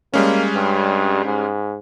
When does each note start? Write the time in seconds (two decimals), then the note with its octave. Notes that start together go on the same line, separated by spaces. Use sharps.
0.14 G3 G#3 A#3 C#4
0.56 G2
1.25 G#2